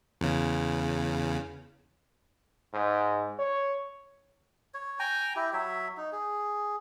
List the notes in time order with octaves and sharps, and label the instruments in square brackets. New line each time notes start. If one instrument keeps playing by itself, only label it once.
[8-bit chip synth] E2 C#3
[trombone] G#2
C#5
[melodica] C#5
G5 G#5 A#5
E4 G4
F#3 C#5 E5
D#4
G#4